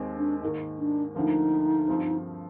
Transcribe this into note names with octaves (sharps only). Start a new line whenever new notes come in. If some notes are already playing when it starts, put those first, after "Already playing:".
Already playing: D#2 D#3 G#3 C4
D4
G#2 D#3 A#3
D4
D2 D3 F3 A#3 D#4
G2 F3 C4